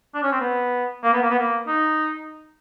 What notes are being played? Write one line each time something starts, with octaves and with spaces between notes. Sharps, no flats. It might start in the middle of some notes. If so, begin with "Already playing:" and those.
D4
C#4
C4
B3
A#3
B3
A#3
B3
A#3
D#4